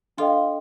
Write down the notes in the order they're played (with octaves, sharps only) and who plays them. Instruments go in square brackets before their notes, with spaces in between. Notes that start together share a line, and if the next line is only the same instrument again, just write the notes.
[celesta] D4 A4 D#5 G5 [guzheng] F4